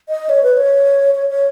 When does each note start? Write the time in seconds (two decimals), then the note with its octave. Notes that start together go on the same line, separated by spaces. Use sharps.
0.09 D#5
0.29 C#5
0.43 B4
0.57 C#5
1.15 C#5
1.30 C#5